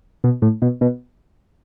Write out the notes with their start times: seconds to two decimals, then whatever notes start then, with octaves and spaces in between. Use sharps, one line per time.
0.24 B2
0.42 A2
0.62 B2
0.81 B2